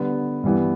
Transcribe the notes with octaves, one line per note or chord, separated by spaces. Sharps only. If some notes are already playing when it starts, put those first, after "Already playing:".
Already playing: D3 G3 B3
G2 E3 G3 B3